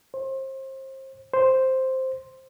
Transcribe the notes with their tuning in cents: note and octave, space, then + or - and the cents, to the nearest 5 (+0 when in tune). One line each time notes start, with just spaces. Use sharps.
C5 +30
C5 +0